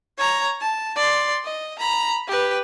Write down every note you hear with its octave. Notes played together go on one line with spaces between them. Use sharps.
C#5 A#5
A5
D5 C6
D#5
A#5 B5
G4 B4